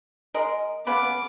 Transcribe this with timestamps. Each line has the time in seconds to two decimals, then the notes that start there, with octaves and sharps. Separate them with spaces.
0.34 G#3 A#4 D#5
0.87 C#3 B3 B4 F5 D6